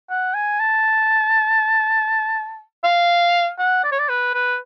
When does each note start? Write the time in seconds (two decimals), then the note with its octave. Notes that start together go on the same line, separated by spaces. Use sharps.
0.10 F#5
0.34 G#5
0.60 A5
2.84 F5
3.59 F#5
3.84 D5
3.92 C#5
3.99 D5
4.09 B4
4.34 B4